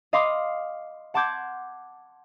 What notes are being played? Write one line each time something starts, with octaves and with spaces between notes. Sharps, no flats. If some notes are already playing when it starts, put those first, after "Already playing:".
D#5 F5 B5 C6 D6 D#6
F#5 A5 C6 D6 G6 G#6